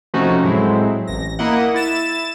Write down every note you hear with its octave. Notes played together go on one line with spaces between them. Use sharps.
C3 F3 A3 C#4 D#4 F#4
A2 F#3 G#3 C4 E4
A1 A#6
A#3 E4 D#5 F#5
E4 A6 E7